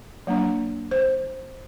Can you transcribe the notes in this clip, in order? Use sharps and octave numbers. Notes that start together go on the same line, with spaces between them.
F#3 A#3 D4
C5